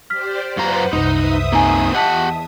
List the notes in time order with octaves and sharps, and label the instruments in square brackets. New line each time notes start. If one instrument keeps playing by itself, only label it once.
[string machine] G4 C5 D5 [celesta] F6 B6
[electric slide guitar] F#2 F4 A#5 [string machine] B4 C5 F#5
[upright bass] C2 F#2 [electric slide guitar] D#4 [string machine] E5 D#6
[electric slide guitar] A#3 C4 D#4 [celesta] G#5 A#5
[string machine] E2 [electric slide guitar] G4 F#5 [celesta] D#5 A5 B6